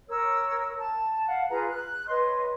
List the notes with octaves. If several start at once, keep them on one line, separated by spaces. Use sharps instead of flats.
A#4 C#5 E6
A5
F5 F#5
F4 G#4 B4 A#5
F#6
B4 C#5 D#5 C6